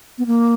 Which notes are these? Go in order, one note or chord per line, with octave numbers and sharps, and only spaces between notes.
B3
A#3